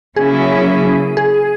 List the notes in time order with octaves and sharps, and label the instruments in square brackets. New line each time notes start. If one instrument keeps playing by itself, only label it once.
[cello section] C#3 F#3 A#3 C#4 E4 [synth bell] G#4
[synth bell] G#4